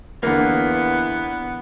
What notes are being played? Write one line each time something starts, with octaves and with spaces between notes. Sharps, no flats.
E2 D3 A#3 B3